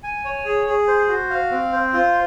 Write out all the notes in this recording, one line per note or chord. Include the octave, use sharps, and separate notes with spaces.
G#5
C#5
G#4
G#4
C5
F#4
F5
C4
C5
F4